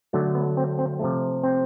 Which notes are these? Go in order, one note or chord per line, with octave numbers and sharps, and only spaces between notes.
D3 F#3 A3
B3
C4
C4
C3 F3 A3
C4